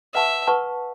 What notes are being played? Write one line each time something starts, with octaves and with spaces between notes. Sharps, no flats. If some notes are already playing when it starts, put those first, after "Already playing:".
B4 E5 F#5 A5 C#6
B4 F#5 A5 C#6